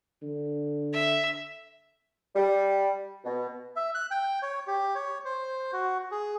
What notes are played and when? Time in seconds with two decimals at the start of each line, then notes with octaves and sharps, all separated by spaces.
0.23 D3
0.93 E5
2.36 G3
3.25 B2
3.76 E5
3.95 F#6
4.11 G5
4.42 C#5
4.67 G4
4.95 C#5
5.25 C5
5.73 F#4
6.11 G#4